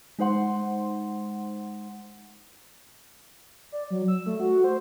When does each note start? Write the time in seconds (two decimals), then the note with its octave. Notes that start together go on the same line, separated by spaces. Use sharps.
0.19 G#3 D#4 C5 F#5 C6
3.72 D5
3.90 F#3
4.08 E6
4.26 A3
4.40 F#4
4.64 C5